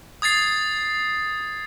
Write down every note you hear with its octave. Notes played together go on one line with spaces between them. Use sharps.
D#6 G#6 A6 C7